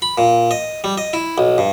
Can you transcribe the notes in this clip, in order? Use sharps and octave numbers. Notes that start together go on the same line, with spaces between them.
B5
A#2
D#5
G3
D#5
E4
B1
G2